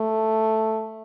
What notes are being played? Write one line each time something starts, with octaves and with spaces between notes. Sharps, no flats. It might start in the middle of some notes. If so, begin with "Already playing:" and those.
Already playing: A3